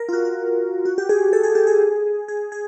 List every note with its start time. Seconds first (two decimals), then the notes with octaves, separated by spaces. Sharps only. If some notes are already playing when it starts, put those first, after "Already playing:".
Already playing: A#4
0.09 F4
0.13 F#4
0.25 F#4
0.85 F#4
0.98 G4
1.09 G#4
1.33 A4
1.43 G#4
1.55 G4
1.67 G#4
2.28 G#4
2.52 G#4